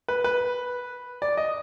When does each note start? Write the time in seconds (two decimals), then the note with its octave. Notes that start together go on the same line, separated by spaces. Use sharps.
0.08 B4
0.24 B4
1.22 D5
1.37 D#5